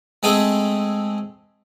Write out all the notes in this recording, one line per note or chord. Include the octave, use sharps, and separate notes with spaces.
G#3 A3 C4 G#4 A4